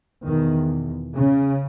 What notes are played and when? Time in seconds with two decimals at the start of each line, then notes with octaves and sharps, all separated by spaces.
0.25 E2 B2 D#3
1.15 C#3